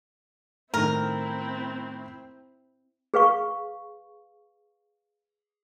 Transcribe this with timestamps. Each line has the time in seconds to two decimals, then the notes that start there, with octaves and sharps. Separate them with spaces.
0.74 A2 D#3 C4 E4 A#4
3.14 G#4 B4 F5 C#6